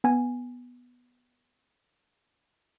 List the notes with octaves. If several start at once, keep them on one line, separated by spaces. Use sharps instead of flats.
B3 G#5